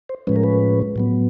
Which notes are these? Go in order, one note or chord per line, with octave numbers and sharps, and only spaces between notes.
C5
A2 F3 G#3 C#4 B4
A#4
B4
A2 F#3 B3